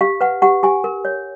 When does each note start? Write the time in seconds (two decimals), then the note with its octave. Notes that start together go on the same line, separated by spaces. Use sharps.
0.01 G4 F5
0.21 B4 F#5
0.42 G4 F#5
0.63 G4 G#5
0.84 A#4
1.05 C#5